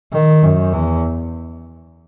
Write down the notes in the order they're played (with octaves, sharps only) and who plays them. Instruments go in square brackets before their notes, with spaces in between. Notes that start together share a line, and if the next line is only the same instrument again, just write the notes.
[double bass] D#3
F#2
E2